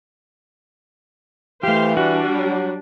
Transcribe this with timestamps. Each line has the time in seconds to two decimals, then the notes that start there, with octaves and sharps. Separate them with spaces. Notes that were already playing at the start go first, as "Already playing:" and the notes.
1.63 E3 A3 G4 C5 F5
1.97 G3 D4 F#4
2.37 F#3